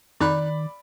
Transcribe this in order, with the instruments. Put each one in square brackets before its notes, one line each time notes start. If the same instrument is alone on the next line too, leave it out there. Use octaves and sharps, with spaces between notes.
[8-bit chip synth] F2 D#4 F#6 [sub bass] D#3 [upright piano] D5 B5